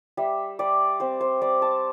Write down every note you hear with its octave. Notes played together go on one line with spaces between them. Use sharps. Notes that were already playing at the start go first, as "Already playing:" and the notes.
G3 E5
G3 D5
C4 C5
C5
G3 D5
A5